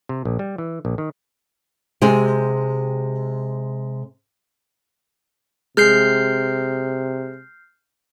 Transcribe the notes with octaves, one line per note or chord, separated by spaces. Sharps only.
C3
A#1
G3
E3
A#1
D#3
C3 G#3 G4 G#5
C3 G#3 F6 G6 C7